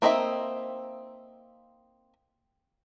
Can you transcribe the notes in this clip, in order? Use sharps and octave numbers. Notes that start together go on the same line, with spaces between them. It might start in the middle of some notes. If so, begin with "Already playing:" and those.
A#3 C4 D#4 A#4 E5